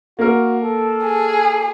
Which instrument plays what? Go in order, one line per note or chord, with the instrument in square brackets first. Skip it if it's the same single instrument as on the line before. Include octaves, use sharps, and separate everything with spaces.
[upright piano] A#3 A#4 [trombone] F#4
[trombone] A4
[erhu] G#4